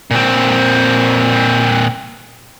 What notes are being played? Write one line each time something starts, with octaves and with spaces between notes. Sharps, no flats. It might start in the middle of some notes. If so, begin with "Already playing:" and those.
A#2 C4